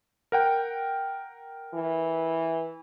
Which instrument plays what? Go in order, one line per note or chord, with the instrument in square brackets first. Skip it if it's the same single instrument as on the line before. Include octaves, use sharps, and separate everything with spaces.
[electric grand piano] A#4 F#5 G5
[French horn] E3